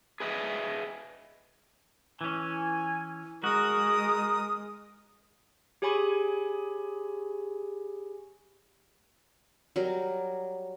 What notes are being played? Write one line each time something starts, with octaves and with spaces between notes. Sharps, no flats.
G#4 B4 D#5 E5
E3 C#4 G#5
G#3 F#4 A#4 D#6
G4 G#4 C#5 G#5 B5 C#6
F#3 G3 A#4